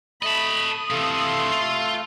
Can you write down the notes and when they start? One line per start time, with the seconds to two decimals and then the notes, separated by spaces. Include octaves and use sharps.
0.23 A3 D#5 A5 B5 D#6
0.90 C3 E3 A3 A4 F5 C6
1.52 F4